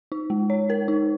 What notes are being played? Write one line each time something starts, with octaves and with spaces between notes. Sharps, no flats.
D#4
G#3
C#5
A#4
D#4